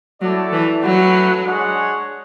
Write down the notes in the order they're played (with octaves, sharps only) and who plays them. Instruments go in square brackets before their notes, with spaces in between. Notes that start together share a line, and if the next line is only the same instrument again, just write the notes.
[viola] F#3 [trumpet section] A3 E4 A4 D5
[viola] E3
[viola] F#3 [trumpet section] A3 C#4 F#4 B4 F#5
[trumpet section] G#3 D4 G#4 C#5 F#5